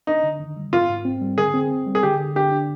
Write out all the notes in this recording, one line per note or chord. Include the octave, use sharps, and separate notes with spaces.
D4 D#4
D3
D#3
G3
G#2 F4
G#2
C4
G3
D3 G#4
C4
C4
G3
G#4
D3 G4
D3
D4 G4
D4